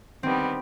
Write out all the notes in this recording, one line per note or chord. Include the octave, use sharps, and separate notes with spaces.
D#3 G3 B3 C4